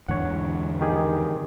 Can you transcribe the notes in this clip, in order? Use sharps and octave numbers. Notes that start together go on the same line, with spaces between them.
E2 G#2 D3 C#5 F#5
D#3 G4 G#4